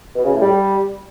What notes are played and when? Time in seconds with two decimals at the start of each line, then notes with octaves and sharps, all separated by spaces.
0.15 B2
0.24 C#3
0.33 A2
0.42 G3